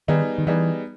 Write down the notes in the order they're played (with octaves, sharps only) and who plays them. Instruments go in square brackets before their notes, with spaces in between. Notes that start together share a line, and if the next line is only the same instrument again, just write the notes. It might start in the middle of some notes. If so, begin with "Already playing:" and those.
[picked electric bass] D#3 [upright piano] G3 B3 D#4 G#4
[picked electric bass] D#3
[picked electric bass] E3 [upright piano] G3 B3 D#4 G#4